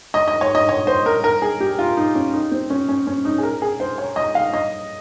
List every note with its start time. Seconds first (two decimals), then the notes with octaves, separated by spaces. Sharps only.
0.14 D#5
0.28 D#5
0.41 C#5
0.55 D#5
0.69 C#5
0.87 C5
1.06 A#4
1.24 A#4
1.42 G#4
1.60 G4
1.79 F4
1.97 D#4
2.15 C#4
2.33 D#4
2.51 C4
2.70 C#4
2.89 C#4
3.07 C#4
3.25 D#4
3.38 G#4
3.43 A#4
3.62 G#4
3.80 C5
3.98 C#5
4.16 D#5
4.35 F5
4.54 D#5